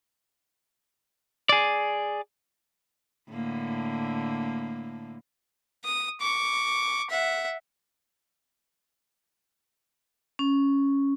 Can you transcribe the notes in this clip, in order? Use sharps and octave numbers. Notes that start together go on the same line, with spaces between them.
G#4 D5
A2 D3 A#3
D#6
C#6 D6
E5 F#5
C#4